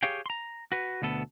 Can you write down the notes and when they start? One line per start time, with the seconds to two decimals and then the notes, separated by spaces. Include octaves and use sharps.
0.03 G4 G#4 C#5 F5 G5
0.26 A#5 C6
0.72 F#4 B4
1.02 D2 B2 B3 A4